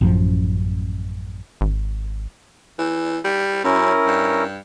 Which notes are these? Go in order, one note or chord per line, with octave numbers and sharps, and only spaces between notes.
A1 F#2 F3
G#1
E3
G3
F#2 C#4 E4 A#4
G2